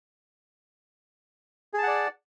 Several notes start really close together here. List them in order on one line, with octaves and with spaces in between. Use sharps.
G#4 A5 F#5 D5